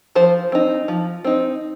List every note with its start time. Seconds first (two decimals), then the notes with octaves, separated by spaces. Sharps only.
0.15 F3 C5
0.52 C4 D#4
0.88 F3
1.25 C4 D#4